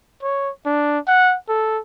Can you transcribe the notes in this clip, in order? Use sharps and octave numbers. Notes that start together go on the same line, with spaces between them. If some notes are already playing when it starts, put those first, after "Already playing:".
C#5
D4
F#5
A4